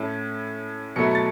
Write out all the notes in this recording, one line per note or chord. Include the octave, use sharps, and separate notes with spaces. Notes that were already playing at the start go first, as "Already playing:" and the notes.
Already playing: A2 A3 C#4 E4
B2 F#3 A3 E4 C#7
A6